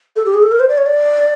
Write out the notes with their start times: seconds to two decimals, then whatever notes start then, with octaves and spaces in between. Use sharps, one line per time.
0.16 A4
0.25 G4
0.34 G#4
0.43 A4
0.51 A#4
0.60 C5
0.69 D5
0.77 C#5
0.86 D5